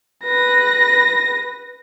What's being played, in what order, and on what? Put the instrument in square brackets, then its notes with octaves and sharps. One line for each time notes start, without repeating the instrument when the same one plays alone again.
[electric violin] B4 A#6